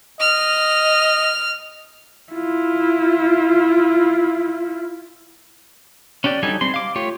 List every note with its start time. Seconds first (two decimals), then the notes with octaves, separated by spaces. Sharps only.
0.20 D#5 F6
2.32 E4 F4
6.24 C#4 D4 G4 D5
6.43 F#3 G3 D#4 A4 G#5
6.61 G3 C4 C6
6.74 F5 D6
6.96 A3 F4 G4 C#5